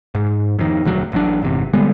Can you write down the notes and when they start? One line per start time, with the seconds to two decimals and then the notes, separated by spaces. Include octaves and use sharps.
0.15 G#2
0.59 F2 D#3
0.84 E1 D2 F#3
1.12 A1 F#3 D4
1.43 G1 E2 C3
1.73 D3 G3 G#3 B3